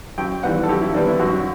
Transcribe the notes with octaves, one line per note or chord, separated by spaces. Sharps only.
F#2 G5
E3 G3 B3 F#5
A4
F#2 G4
E4
E3 G3 B3 D4
E4
F#2 F#4